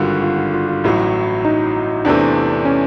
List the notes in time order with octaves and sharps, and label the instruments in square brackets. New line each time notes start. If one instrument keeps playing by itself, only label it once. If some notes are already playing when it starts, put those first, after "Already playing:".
Already playing: [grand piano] G#1 G2 D3 [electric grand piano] F4 F#4
[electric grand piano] F4
F4
F4
F4
[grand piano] A1 A2 F#3 [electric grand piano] E4
[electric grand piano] D#4
[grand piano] E2 C3 E3 A3 C4 [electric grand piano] D4
[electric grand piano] C#4